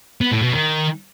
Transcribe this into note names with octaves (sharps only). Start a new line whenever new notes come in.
B3
A2
B2
D#3